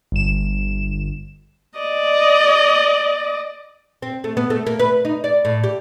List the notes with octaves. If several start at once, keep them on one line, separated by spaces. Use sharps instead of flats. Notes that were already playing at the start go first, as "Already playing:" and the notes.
G1 E7
D5 D#5
C4
A3
B3
A3
A#3
B4
D#4
D5
A2
G4